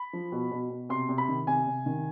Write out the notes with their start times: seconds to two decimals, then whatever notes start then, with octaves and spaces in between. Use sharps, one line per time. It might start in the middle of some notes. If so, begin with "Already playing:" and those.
Already playing: B5
0.13 F3
0.32 B2
0.51 B2
0.70 B2
0.89 C3 C6
1.09 C3
1.18 B5
1.28 D#3
1.47 C3 G#5
1.66 C3
1.86 D#3